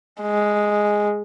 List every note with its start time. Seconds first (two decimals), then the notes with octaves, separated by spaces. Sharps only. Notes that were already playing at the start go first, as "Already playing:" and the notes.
0.22 G#3